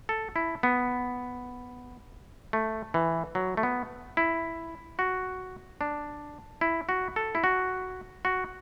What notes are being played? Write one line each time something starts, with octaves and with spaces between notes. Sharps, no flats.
A4
E4
B3
A3
E3
F#3
A3
B3
E4
F#4
D4
E4
F#4
A4
E4
F#4
F#4